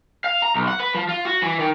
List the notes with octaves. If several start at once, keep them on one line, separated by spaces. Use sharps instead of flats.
F5
A#5
B1
F#5
B4
F3
F4
F#4
E3
D#3